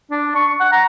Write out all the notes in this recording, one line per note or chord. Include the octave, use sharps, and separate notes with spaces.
D4
C#6
F#5
A#5